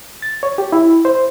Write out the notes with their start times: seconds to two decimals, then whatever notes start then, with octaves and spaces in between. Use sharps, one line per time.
0.22 A6
0.43 C#5
0.58 G4
0.72 E4
1.05 C5